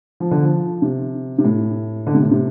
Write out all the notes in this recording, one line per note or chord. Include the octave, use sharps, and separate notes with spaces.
F3
D3
F3
C3
C3
A2
D3
C3
A2
C3